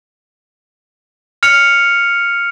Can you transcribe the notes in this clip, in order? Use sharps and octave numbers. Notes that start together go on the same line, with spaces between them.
F6 C#7 F7